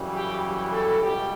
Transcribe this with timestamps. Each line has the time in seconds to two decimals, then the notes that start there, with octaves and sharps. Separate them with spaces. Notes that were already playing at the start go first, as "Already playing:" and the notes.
Already playing: F#2 C#3 E3 G3
0.13 G4
0.43 G4
0.70 A4
0.99 C#2 B2 G3 G4